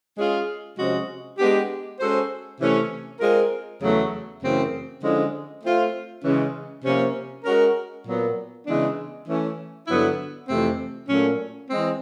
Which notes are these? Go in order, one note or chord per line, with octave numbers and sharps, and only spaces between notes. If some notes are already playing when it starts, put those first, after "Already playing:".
G#3 C#4 F4 G#4
C3 F3 G#3 C#4 F#4
G#3 B3 D4 G4
G#3 C#4 F#4 A4 C5
C3 E3 A3 C#4
G#3 C4 F4 A#4
E2 C#3 F#3 A3
F#2 C#3 E3 A3 C4
D3 F3 G#3 C#4 E4
A3 C4 F4
C#3 E3 G#3 C#4
C3 F3 A#3 C#4
G#3 C#4 F#4 A#4
A#2 F#3 B3
C#3 E3 G#3 B3 D4
E3 A3 C#4
G2 D3 F#3 B3 E4
F2 C3 E3 A3 C4
A#2 F#3 A3 C#4
E3 G#3 C4